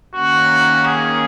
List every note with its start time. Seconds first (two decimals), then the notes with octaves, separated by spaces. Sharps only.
0.15 D#3 A#3 C#4 F#4
0.85 G#4